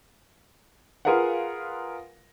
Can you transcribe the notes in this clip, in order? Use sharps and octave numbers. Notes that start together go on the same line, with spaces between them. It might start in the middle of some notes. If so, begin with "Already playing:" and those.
F4 G#4 A#4 B4 F5 F#5